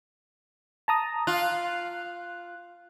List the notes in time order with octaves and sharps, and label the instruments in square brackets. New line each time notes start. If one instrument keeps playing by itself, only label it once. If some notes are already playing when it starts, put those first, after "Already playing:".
[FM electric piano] A5 A#5 D#6
[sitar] F4 [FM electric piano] F#6